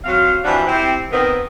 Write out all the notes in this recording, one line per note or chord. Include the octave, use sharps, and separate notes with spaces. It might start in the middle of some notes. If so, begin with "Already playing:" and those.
F#3 C4 F4 F5
E3 F3 G3 C4 D4 F#4
C4 E4 G4
D#3 B3 C4